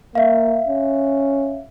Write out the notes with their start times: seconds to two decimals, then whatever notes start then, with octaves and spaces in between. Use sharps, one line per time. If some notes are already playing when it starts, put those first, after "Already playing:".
0.15 A#3 E5 F5
0.67 C#4